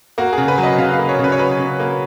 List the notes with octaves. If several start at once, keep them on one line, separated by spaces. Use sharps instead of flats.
A#3 F#4
G#4
C#3
B4
F#3
D#5
C#3 F5
F5
A#3
C#5
C#3
B4
C#5
F#3 B4
C#3
A#3